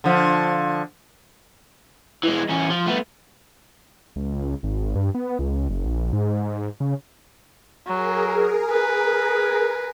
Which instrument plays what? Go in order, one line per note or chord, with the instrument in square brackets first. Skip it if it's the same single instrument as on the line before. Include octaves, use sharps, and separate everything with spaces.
[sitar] D3 F3
[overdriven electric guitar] E3 G#3
E2 C#4
F3
A3 B3
[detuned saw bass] C#2
G#1
G2
B3
C#2
F#1
A#1
G#2
G#2
C#3
[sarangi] F#3 [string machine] G#4 A#4
[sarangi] B4